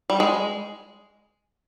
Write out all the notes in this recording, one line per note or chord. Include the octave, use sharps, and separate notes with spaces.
G3
G#3